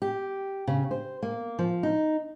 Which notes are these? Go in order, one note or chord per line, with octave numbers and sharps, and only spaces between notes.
G4
C#3
C5
A#3
F3
D#4